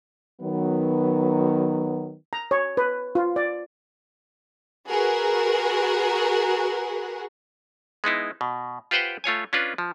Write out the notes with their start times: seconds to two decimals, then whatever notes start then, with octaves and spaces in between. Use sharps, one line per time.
0.41 D#3 F#3 B3
2.33 A#5
2.51 C#5
2.77 B4
3.15 F4
3.36 D5
4.89 F#4 G#4 A#4 B4
8.04 G#3 B3 D#4 E4
8.41 B2
8.91 F4 G4 B4 C5 F#5 G5
9.24 A3 F4 C#5 G#5
9.53 C#4 D4 F4 B4
9.78 F3